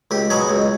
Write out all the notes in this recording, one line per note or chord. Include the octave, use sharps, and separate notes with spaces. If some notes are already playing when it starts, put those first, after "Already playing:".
C#2 G4
B2 F#3 G#4
C#2